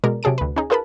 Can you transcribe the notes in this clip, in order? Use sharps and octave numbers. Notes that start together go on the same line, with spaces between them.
B2 G#3 A#4 D5
C3 F#3 G#4 A5 D7
D2 B4
C#4 D#4 G#4
F4 G#4 A#4 B4 A5 B5